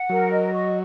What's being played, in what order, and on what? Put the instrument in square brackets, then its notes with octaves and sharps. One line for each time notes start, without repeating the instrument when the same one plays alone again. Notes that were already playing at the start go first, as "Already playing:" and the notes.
Already playing: [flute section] F#5
[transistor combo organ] F#3 [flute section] A#4
[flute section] D#5
C#6